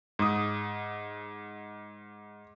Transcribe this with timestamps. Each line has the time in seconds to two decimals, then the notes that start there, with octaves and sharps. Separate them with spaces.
0.19 G#2 D#6